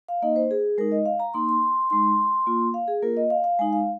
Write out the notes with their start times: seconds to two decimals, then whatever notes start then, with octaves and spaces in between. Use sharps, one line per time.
0.08 F5
0.22 A#3 D#4 D#5
0.36 C5
0.51 G#4
0.78 G#3 D#4 A#4
0.92 D#5
1.06 F5
1.20 A#5
1.34 A#3 D#4 C6
1.49 C6
1.90 G#3 D#4 C6
2.47 A#3 F4
2.74 F5
2.88 G#4
3.02 A#3 F4 A#4
3.17 D#5
3.30 F5
3.44 F5
3.59 G#3 D#4 G#5
3.73 F5